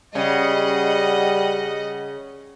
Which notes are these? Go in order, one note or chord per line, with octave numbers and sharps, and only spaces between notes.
C#3 G3 D#5 F#5